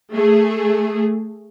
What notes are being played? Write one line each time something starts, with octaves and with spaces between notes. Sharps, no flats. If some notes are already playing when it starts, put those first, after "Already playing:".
A3 G#4